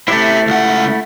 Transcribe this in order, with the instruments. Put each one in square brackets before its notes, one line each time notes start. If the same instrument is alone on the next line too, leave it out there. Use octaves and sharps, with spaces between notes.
[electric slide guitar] A3 E4 [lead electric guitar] C5 E5
[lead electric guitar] C#2 F#5